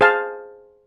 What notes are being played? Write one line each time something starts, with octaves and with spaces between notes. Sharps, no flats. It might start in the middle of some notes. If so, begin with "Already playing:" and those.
G#4 C5 F5 A5